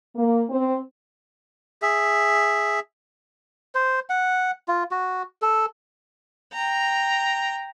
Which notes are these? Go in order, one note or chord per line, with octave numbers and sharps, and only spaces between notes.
A#3
C4
G#4 E5
C5
F#5
F4
F#4
A4
G5 A#5